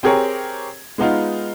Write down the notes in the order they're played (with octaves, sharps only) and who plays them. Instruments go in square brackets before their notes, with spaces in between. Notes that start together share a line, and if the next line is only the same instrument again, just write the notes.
[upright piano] C4 G4 G#4 A#4 C#5
G#3 B3 D#4 F4